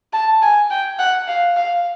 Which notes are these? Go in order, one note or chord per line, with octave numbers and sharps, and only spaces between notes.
A5
G#5
G5
F#5
F5
F5